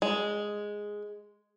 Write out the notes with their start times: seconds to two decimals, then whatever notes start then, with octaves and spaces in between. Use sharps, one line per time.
0.02 G#3